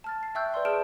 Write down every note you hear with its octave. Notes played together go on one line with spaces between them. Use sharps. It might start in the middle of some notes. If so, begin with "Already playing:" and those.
A5 F6 A6
C7
E5 G5 C#6 E6 F#6 G6
B4 D5 C6 G6
G#4 A5 F6 D7 E7